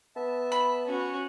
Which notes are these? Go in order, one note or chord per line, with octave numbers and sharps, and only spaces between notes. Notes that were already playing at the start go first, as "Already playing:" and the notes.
B3 E5 A5
B5
C#4 F#4